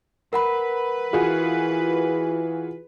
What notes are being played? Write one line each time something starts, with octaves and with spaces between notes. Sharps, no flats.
A#4 B4 F#5 B5
E3 F4 F#4 G#4